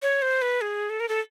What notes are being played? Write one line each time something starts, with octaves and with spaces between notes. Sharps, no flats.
C#5
C5
B4
G#4
A4
A#4
A4